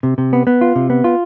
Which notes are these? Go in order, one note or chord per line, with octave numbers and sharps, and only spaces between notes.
C3
C3
B3
B3
F4
C3
B3
F4